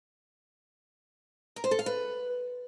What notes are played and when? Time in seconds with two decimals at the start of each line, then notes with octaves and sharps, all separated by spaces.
1.56 A#4
1.64 C5
1.71 A4
1.79 F5
1.86 B4